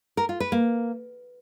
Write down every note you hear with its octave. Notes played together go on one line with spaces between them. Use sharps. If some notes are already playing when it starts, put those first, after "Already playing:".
A#4
F4
B4
A#3